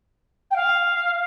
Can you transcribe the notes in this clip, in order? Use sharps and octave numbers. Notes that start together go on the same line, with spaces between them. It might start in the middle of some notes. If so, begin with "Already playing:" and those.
G5
F5